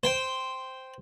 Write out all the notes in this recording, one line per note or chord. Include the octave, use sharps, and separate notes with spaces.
C5 G5